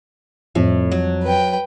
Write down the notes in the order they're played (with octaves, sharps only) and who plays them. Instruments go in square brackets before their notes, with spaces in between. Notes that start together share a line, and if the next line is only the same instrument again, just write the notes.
[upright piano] F2 [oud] A2
[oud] F#3
[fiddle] B4 G5